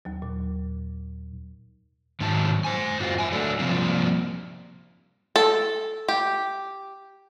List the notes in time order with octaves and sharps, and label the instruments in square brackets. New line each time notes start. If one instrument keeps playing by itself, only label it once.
[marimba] D#2 F#3
A#2
[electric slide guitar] G#2 D#3 F#3 A5
C5 G#5
F#2 F4 F#4
E5 G#5
F#3 A3 D4 A4
C3 F3 G3 A#3 C4 F4
[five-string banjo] A4
G4